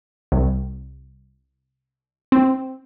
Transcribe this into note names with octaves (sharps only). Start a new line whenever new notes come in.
C2
C4